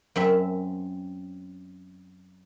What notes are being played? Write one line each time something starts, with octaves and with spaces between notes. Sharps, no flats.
F#2 C4 E5